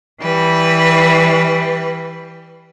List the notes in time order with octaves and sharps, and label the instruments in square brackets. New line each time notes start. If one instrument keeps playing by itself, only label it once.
[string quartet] E3 G3 B4